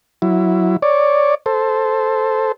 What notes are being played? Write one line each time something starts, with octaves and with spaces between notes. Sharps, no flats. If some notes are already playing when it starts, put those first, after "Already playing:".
F#3 E4
C#5 D5
A4 C5